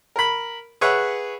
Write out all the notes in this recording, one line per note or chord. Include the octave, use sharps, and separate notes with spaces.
A#4 B5
G#4 B4 C#5 E5 F#5